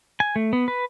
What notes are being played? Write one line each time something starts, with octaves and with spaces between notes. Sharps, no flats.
G#5
A3
B3
B4